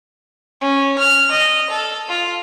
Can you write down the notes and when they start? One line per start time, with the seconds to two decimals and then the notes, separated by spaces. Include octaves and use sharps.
0.61 C#4
0.98 F6
1.31 D#5
1.70 A4
2.09 F4